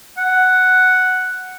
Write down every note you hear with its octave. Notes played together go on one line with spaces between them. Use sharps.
F#5